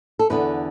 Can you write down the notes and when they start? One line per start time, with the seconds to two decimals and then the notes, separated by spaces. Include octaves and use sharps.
0.19 A4
0.30 E2 D3 B3 B4